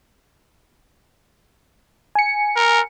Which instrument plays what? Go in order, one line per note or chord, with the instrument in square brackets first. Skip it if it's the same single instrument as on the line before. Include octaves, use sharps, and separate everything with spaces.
[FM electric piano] G#5 C#7
[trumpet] A#4